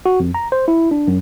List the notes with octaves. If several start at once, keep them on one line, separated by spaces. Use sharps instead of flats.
F#4
F2
A#5
C5
E4
D4
F#2